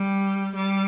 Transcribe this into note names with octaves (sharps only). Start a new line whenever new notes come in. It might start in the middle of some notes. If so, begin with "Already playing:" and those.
Already playing: G3
G3